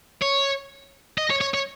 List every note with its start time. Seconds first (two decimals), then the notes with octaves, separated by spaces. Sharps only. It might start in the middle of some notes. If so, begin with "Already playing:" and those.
0.22 C#5
1.18 D#5
1.30 C#5
1.41 C#5
1.54 C#5